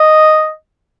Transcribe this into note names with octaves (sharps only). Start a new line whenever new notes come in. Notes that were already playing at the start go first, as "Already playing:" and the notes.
Already playing: D#5